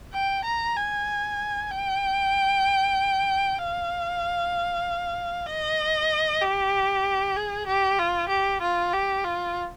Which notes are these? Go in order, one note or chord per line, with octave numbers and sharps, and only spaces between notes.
G5
A#5
G#5
G5
F5
D#5
G4
G#4
G4
F4
G4
F4
G4
F4